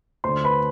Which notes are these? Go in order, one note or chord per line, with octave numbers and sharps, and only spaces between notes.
D2 D3 C5 C6
B4 B5